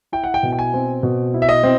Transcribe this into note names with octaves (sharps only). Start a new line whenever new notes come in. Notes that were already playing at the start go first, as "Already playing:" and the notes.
E4 G5
F#5
G5
B2
G5
G#5
C4
B2
E4
E5
D#5
C4